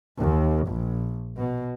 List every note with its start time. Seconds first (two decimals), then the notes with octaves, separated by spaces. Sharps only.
0.18 D#2
0.66 A#1
1.39 B2